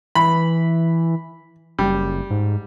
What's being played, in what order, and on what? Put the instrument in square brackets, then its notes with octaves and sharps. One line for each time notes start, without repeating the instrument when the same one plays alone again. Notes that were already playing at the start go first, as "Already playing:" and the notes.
[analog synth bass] E3 [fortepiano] B5
[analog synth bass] F#1 [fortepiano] G3
[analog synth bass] G#2